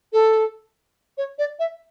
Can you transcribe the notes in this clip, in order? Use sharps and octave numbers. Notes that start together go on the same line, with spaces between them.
A4
C#5
D5
E5